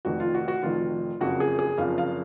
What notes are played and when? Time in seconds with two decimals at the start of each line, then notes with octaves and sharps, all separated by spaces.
0.05 F1 F2 D#3 F#4
0.20 F4
0.34 F#4
0.48 F#4
0.63 F1 F2 D#3 F4
1.20 F#1 F2 C#3 F3 F#4
1.40 G#4
1.59 G#4
1.78 F#1 F2 C#3 F3 F5
1.98 F5